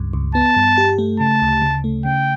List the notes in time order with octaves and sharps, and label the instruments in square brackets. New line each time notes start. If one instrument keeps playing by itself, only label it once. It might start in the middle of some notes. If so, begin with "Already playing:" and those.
Already playing: [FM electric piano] C#2 G2
C#2
[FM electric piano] B3 [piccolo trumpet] A5
[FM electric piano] G2
G4
A3
[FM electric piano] C#3 [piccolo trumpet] A5
[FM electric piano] D2
C#3
A3
[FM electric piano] C#3 [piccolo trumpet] G5